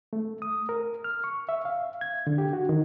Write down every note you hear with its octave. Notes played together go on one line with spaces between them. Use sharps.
A3
D#6
A#4
F6
C#6
E5
F5
G#6
D3
G4
F#4
D#3